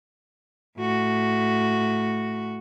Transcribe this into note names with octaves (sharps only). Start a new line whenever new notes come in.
A2 F#4